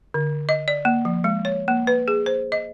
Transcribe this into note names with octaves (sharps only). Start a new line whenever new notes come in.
D3
D#5
D5
A#3
F3
G#3
C#5
A#3
B4
G#4
C5
D#5